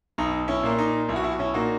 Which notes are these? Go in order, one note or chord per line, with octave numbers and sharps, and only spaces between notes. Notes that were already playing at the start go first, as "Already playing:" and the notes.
B1 D#4
C#4 E4
A#2 A#3
D#4
B1 E4
F#4
E4
F#4
C#4 E4
A#2 A#3 D#4 F#4